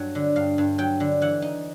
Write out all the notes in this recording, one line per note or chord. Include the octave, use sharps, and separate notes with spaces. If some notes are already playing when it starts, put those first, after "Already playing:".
Already playing: G2 F#3
D3
G2 F5
G2
F#3 G5
D3
E3 F#5
D#4